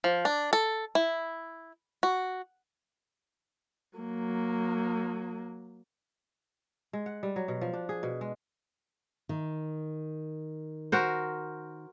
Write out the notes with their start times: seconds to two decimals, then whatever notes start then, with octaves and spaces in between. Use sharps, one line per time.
0.04 F3
0.25 D4
0.53 A4
0.95 E4
2.03 F#4
3.98 F#3 A#3
6.93 G#3
7.06 F#5
7.23 G3
7.36 F#3
7.48 B2
7.61 F3
7.73 D4
7.89 G#4
8.03 B2
8.21 G#3
9.29 D#3
10.92 F#4 A#4 C5